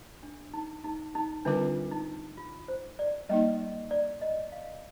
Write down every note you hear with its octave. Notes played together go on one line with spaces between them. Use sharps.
D4
D#4
D#4
D#4
D3 G3 C4 D4 F4 A#4
D#4
F4
C5
D5
G3 A#3 D#4 D#5
D5
D#5
F5